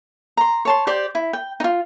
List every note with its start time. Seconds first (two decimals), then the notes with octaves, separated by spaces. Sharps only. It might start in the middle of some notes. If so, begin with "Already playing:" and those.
0.37 A#5 C6
0.65 C#5 A5 C6
0.87 G4 C5 D5 G5
1.15 E4
1.33 G5
1.60 D#4 F4